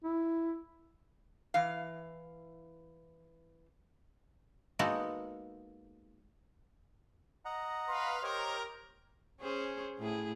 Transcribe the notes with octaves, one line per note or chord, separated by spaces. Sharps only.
E4
E3 F5
G#3 A#3 B3 D#4 F#4 A4
D#5 F#5 A#5
B4 F5 C6
G4 A#4 C5 C#5 D#5
C#4 G#4 C5
A2 E4 G#4